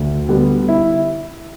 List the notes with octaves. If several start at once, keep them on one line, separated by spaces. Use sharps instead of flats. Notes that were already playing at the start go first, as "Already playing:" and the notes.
Already playing: D2
D3 G3 B3
E4